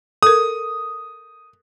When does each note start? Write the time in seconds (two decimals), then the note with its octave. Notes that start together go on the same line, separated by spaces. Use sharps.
0.23 A4 A#4 D#6